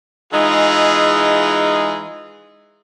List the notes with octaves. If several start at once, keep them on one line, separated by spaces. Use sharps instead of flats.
E3 G#3 D#4 F4 G#4